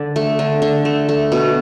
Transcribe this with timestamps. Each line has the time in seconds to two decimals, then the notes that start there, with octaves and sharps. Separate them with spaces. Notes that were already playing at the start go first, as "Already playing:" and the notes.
Already playing: D3 D5
0.16 A3
0.39 D3
0.62 D3
0.85 A3
1.09 A3
1.32 B2